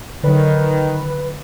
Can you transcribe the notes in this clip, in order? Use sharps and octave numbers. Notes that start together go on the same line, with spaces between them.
D3 D#3 F#3 B4